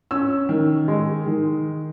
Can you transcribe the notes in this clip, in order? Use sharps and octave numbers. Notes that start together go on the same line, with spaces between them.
C#4 E6
D#3
G#3
D#3